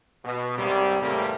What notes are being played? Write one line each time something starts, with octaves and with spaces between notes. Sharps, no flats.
B2
D#2 G#2 C3 G3
E2 A2 C3 G3 A3 A#3